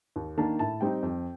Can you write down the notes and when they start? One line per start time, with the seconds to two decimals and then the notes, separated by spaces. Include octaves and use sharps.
0.16 D#2
0.38 D#3 A#3 D4 A5
0.59 A2 A5
0.81 G3 C4 D#4 G5
1.03 F2